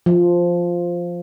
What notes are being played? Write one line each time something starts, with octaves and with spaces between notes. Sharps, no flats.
F3